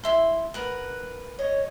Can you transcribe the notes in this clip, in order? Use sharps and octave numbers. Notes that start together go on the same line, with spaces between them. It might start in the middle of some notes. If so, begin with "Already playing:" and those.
E4 E5 C6
A#4 B4 F#5
C#5 D#5